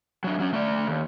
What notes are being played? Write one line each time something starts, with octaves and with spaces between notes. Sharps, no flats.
F#3 D4
F#3 C#4
A3 D5
D#2